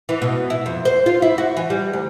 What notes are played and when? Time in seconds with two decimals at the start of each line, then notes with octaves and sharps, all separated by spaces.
0.09 E3
0.22 B2
0.50 E4
0.66 F2
0.85 C5
1.06 F4
1.22 E4
1.38 F#4
1.57 E3
1.70 G3
1.93 D2